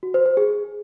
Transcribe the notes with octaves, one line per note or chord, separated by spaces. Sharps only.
F#4
C5
C5
G#4